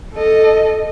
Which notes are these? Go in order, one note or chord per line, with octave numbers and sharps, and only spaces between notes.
A4 D#5